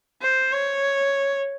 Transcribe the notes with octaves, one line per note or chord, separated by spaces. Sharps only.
C5
C#5